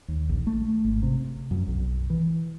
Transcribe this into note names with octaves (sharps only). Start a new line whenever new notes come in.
D#2
A#1
A3
G#1
C3
F#2
B1
E3